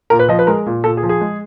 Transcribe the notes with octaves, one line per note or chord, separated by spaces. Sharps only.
A#2 A#4
B4
F3 D#5
B4
G#3 A#4
A#2
A#2 A4
G#4
F3
G#4
G#3